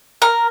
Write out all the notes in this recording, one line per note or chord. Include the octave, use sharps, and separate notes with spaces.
A#4